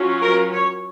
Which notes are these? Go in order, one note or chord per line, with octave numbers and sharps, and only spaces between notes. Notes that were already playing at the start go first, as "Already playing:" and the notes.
Already playing: F#3 C#4 F4
A#4
C#5